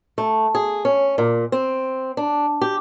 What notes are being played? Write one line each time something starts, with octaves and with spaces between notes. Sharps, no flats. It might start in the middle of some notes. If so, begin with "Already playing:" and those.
A3
G#4
C#4
A#2
C4
D4
G4